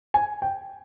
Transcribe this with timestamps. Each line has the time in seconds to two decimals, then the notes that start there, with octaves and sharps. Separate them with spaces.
0.14 G#5
0.42 G5